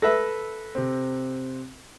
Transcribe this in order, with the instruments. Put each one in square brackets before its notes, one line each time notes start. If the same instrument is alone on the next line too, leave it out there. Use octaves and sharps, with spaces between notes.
[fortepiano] A4 B4 E5 [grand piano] A#6
[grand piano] C3 C4